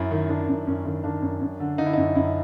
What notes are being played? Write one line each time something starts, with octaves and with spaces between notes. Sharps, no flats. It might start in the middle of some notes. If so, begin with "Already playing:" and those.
Already playing: F#2 E4
D#3
D#3 D4
F#2
F#2 C#4
D#3 C#4
D#3 D4
F#2
F#2
D3
D3 D#4
E4
F#2 D#4
F#2 E4